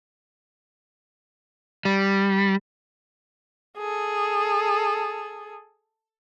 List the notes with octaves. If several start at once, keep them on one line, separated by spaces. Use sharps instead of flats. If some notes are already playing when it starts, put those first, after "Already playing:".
G3
G#4 A4